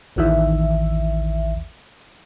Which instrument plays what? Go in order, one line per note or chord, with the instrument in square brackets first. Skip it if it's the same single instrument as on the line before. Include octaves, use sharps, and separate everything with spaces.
[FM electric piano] A1 D#2 D#3 E3 E5